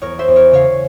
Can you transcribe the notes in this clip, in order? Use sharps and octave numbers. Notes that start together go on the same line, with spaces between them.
E2 A#4 C#5
C5 E5
E2
A#4 C#5
C#3 C#5 F5